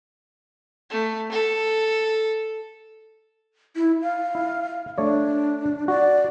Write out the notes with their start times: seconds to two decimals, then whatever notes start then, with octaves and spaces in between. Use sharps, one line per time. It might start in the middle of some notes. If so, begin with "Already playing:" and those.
0.90 A3
1.31 A4
3.76 E4
4.02 F5
4.35 E4
4.98 A3 D4 C#5 D5
5.88 F#4 D5